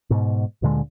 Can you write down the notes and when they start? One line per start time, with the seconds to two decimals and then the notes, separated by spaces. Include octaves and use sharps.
0.10 G#2 B2
0.62 D2 A#2 D3 G#3